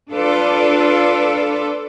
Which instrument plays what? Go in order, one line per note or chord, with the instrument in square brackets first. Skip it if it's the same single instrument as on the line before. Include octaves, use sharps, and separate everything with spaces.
[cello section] D4 F4 A4 B4 D5